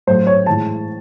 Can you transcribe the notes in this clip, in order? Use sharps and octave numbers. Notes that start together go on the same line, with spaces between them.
A2 F#3 A3 C5
C#5
A2 E3 G#3 A5